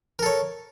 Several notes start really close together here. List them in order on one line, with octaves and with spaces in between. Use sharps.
A#4 A4 C#5